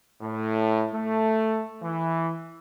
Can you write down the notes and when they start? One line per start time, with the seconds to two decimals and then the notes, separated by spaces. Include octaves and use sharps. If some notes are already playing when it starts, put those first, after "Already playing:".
0.21 A2
0.94 A3
1.83 E3